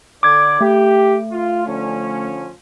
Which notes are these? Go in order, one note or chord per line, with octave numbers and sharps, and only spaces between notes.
D3 D5 D6 G#6
A3 G4
F4
D3 F3 C#4